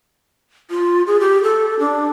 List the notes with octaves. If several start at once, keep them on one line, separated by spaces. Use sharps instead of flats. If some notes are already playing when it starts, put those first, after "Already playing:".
F4
G#4
G4
A4
D4